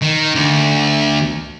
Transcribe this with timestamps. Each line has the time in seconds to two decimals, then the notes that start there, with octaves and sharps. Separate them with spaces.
0.02 D#3
0.35 D2